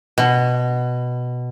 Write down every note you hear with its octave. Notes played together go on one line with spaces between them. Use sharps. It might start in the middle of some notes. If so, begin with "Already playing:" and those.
B2